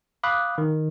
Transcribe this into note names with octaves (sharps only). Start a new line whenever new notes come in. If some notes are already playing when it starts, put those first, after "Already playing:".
F5 B5 D6 D#6 F#6
D#3